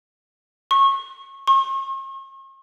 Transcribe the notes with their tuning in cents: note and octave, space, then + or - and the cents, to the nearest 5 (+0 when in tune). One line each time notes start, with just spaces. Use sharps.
C#6 -25
C#6 -45